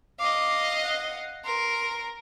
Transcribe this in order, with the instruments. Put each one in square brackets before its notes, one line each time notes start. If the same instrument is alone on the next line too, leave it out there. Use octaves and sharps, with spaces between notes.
[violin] D#5 F5 [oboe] D6
[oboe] F#5
[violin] A#4 [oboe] C6